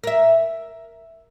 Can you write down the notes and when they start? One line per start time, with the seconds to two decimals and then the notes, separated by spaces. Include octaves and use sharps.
0.03 A#4 E5